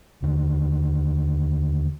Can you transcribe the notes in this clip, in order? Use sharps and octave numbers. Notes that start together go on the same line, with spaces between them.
D#2 D3